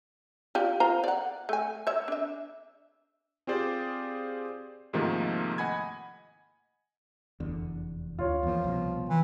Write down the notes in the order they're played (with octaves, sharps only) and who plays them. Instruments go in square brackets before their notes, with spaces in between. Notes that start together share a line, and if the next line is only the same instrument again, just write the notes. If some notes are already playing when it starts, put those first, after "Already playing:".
[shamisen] F4 G4 D5
F4 C5 A#5
D5 F#5
A3 G#5
C#5 E5
D4 E5
[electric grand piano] C4 F4 G4 G#4 C5 D5
G#2 C3 D#3 F3 A3 A#3
D#5 F#5 G#5 B5 G#6
[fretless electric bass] F1 E2 D3
[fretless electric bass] D2 [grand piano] F4 C#5
[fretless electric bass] E2 A#3 [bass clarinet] F3
[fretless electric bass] C2 B2
[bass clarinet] E3